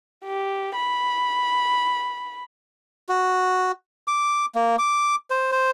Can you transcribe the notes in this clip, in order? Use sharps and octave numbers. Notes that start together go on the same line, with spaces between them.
G4
B5
F#4
D6
A#3
D6
C5
C5